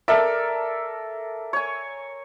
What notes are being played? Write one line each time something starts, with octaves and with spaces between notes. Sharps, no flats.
A4 A#4 D5 E5
C#5 G#5